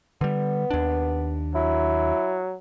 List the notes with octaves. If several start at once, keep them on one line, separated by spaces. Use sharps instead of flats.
D3 G3 B3
D#2 D4
F#3 E4